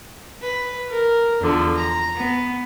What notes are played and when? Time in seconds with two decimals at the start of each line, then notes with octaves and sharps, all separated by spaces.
0.42 B4
0.91 A#4
1.41 E2 D3 F3
1.75 A#5
2.16 B3